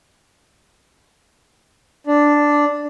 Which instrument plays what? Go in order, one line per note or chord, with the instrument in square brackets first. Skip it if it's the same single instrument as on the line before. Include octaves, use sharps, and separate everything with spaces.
[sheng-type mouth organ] D4